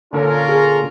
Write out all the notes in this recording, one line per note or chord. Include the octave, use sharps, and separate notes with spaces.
A#2 D3 C#4 F4 A4 A#4
G#4